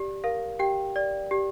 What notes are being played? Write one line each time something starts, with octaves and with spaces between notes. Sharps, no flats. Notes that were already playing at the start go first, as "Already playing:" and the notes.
Already playing: G4 D5
A#4 F5
G4 G5
D5
G4